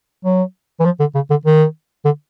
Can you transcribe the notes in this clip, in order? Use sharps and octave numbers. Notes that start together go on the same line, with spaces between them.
F#3
E3
F3
D3
C#3
D3
D#3
D3